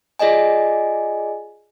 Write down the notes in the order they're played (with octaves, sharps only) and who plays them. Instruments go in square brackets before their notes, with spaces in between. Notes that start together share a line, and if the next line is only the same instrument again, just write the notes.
[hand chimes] F4 G#4 D5 D#5 G#5